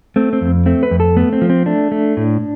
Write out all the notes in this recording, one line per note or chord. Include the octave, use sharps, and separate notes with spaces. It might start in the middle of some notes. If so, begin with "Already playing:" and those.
A3 C4
C4
F2
A3 C4
B4
F2
A4
A3 B3
C4
F3
C4
A3 D4
A3
A2